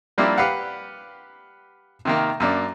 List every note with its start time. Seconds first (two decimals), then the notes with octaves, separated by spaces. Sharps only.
0.18 F3 G3 A#3 C4 D4 E4
0.38 G4 B4 F5 F#5
2.05 C3 D#3 A#3
2.40 F#2 A#3 D4